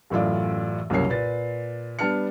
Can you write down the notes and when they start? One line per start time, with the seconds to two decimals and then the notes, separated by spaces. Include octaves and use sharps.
0.10 A1 F#2 A2 F4 D5
0.90 C2 F#2 C#3 A#3 C#5 C7
1.09 A#2 B4 A6
1.99 G3 B3 D4 A5 F6 C#7